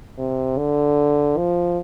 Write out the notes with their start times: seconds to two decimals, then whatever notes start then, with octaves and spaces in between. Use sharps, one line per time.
0.18 C3
0.58 D3
1.37 F3